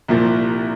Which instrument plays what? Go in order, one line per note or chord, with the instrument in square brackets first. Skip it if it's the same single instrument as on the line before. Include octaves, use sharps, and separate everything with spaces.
[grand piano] C2 A#2 F3